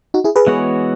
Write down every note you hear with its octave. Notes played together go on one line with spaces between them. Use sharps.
D#4 F#4
E4 G#4
G#4 B4
E3 G#3 B3 F#4 C#5